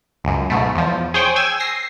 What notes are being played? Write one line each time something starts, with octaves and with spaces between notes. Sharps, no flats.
C#2 F#2
G#2 B2 A3
E2 F3
G#4 C5 C#5 G5
G5 G#5 E6
A#6 C7